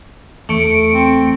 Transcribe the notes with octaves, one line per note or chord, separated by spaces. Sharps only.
E2 A3 C#7 D7
C4